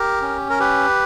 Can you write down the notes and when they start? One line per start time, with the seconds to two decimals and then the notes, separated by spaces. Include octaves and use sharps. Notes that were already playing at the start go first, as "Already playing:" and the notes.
Already playing: G4 A#4
0.22 C#4
0.50 A#4
0.60 G4 B4